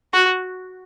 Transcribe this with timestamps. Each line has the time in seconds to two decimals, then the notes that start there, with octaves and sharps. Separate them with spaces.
0.13 F#4